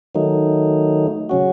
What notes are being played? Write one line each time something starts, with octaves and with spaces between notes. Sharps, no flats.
D#3 F#3 A3 D#4
C#3 F#3 C#4 F#4